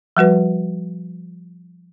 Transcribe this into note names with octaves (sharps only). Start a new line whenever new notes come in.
F3 G3 F#4 B4